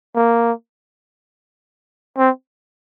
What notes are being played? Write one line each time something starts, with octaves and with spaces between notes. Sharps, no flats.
A#3
C4